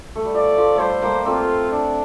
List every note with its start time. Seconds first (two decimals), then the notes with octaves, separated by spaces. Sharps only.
0.16 A3
0.25 G3
0.34 F3 D5
0.57 F3 A3
0.76 G3 A3 C5
1.02 G3 A#3
1.25 A3 C4 F4
1.71 D4